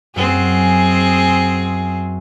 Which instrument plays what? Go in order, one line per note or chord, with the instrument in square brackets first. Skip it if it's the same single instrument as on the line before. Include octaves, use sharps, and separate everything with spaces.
[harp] F#2 [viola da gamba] C4 G#4